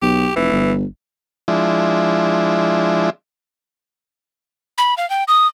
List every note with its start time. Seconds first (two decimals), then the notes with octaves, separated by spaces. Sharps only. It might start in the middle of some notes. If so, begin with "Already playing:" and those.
0.02 B1 G4
0.36 F1 E3
0.52 G1
1.48 F3 G#3 D4 E4
4.78 B5
4.97 F5
5.10 G5
5.28 D#6